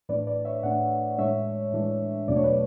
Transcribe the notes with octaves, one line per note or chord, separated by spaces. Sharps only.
A2 E3 A3 D4 B4 D5
B4 D5
C#5 E5
A2 E3 A3 D4 D5 F#5
A2 E3 G#3 D4 C#5 E5
A2 E3 G#3 D4
E2 B2 F#3 A3 D4 D5
C#5
B4 D5